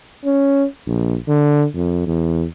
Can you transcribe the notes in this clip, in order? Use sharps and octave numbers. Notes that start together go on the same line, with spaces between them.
C#4
A#1
D3
F2
E2